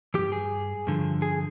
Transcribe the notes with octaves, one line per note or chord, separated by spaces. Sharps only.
G2 E3 G4
G#4
G2 D3 F3
G#4